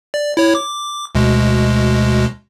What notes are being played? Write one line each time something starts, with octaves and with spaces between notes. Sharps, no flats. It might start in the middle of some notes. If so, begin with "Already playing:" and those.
D5
E4 C#5
D6
D2 B2 G#3